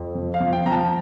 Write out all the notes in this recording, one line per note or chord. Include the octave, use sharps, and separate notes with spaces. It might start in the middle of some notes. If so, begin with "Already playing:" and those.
Already playing: F2
F3
F5
F3
G5
F3 A#5
A5